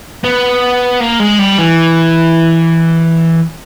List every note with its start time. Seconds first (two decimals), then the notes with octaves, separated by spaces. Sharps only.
0.24 B3
1.01 A#3
1.20 G#3
1.39 G3
1.58 E3